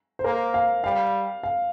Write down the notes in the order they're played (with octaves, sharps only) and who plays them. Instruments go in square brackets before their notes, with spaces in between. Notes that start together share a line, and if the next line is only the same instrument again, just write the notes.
[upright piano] C5
[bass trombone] A#3 [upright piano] A#4
[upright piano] F5
[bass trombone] G3 [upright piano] F5
[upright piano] F5